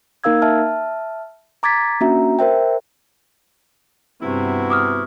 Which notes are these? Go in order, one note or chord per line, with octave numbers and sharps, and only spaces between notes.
A#3 D#4 A#4 F5 E6 G#6
E5 A5 F6
A#5 D6 G#6 A6 B6
A#3 C#4 D4 F#4 E5 A#5
A#4 C5 E5 G5
G2 C3 B3 E4 F#4
D6 D#6 F6